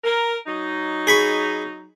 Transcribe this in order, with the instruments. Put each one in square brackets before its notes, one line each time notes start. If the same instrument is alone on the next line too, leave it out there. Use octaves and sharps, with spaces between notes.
[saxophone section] A#4
F#3 D#4
[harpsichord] G#4 B5 C#6